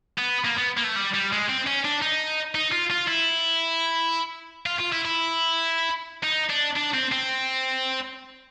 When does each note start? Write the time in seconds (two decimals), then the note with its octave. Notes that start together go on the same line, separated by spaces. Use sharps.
0.18 B3
0.44 A#3
0.57 B3
0.77 A#3
0.84 A3
0.96 G3
1.14 G3
1.32 G#3
1.49 C4
1.67 C#4
1.85 D4
2.02 D#4
2.55 D#4
2.72 F4
2.90 F4
3.07 E4
4.66 F4
4.79 F4
4.92 E4
5.05 E4
6.24 D#4
6.50 D4
6.77 D4
6.94 C4
7.12 C4